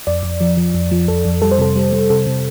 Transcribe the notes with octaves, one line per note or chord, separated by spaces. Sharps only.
F2 D5
F2
F3
F3
F2
F3
F2 A4
F2
G3 A4
C5
C3 A4
G3
G3
C3 A4
C3